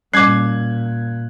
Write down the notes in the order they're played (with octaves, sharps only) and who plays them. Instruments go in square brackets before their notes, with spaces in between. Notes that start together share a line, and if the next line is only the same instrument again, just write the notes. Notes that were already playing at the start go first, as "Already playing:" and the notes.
[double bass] A#2 [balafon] G3 C#4 [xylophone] D6 C7 [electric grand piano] F#6 G#6